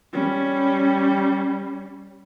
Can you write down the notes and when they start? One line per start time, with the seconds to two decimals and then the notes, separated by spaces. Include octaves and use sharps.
0.13 G3 C#4